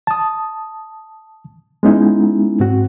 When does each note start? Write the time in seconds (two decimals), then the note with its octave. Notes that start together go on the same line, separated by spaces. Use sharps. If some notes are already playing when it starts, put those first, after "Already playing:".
0.07 A5 D#6
1.83 G#3 B3 C#4 D#4 E4
2.60 G#2 C4 F#4